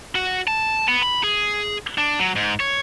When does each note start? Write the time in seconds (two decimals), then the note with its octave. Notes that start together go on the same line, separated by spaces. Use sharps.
0.15 F#4
0.47 A5
0.88 B3
1.02 B5
1.23 G#4
1.98 D4
2.19 F#3
2.36 G#2
2.60 C#5